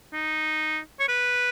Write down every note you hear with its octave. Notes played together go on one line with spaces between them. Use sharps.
D#4
C#5
B4